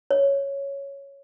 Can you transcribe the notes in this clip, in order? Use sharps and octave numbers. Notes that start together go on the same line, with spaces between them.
C#5